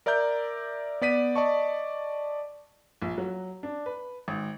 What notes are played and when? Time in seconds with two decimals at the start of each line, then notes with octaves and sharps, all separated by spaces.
0.06 A#4 D5 E5 A#5 G6
1.01 B3 D5 B6 D#7
1.35 D5 D#5 A5 C#6
3.02 A#1
3.18 F#3
3.63 D4
3.86 B4
4.28 G#1